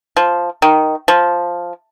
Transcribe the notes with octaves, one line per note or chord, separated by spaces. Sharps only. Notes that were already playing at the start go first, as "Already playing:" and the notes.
F3
D#3
F3